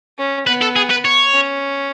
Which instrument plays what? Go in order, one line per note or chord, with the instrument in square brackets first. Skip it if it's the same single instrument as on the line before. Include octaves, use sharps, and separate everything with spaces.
[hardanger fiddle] C#4
[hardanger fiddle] B3 [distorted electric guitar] B4
[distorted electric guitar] A4
G#4
B4
C#5
[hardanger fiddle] C#4